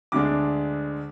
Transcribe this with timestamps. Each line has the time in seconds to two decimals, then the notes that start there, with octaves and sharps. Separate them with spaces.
0.12 D2 D3 G#3 D4 D6